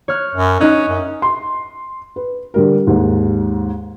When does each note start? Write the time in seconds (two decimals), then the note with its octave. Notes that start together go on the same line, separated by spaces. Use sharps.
0.08 C#5 F6 F#6
0.35 F#2
0.60 C#4 D#4 D#5 F#6
0.88 F#2
1.22 C6
2.16 B4
2.54 D3 G3 A#4
2.87 D#2 G#2